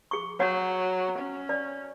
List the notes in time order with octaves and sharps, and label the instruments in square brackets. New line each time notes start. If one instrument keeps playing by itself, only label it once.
[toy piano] G#4 C#6
[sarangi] F#3 [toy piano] C#5 F#5
[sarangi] C#4
[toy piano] D5